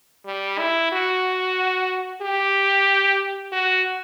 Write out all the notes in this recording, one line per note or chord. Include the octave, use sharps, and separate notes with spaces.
G3
E4
F#4
G4
F#4